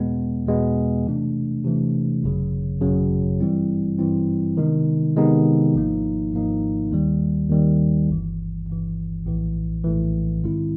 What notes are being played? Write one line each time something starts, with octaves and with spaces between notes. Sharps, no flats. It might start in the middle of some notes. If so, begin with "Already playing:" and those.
Already playing: E2 B2 G#3 B3
E2 B2 G#3 B3
C3 E3 A3 D4
C3 E3 A3 D4
G#1 F#2 C#3 F#3
G#1 F#2 C#3 F#3
G2 E3 G3 C4 E4
G2 E3 G3 C4 E4
C3 D#3 G#3 B3 D#4
C3 D#3 G#3 B3 D#4
G#1 G#2 F3 A#3 D#4
G#1 G#2 F3 A#3 D#4
D#2 D#3 G3
D#2 D#3 G3
G1 G2 E3
G1 G2 E3
A#1 A2 E3
A#1 A2 E3
G#2 D#3 G#3 C4 E4